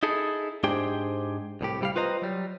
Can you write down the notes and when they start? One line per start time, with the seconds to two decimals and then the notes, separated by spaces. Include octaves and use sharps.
0.03 D#4 E4 G#4 A4
0.64 G#2 D4 G4 G#4 C5 G5
1.61 C2 A2 G4
1.81 C3 G3 F5
1.96 F4 B4 C5 D#5 A#5
2.22 F#3 G3